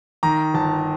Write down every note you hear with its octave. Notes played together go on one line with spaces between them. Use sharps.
D#3 A#5
G1 A5